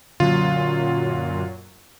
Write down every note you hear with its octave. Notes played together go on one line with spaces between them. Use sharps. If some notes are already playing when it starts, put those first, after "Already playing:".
F#2 A#2 D3 F#3 C#4 F4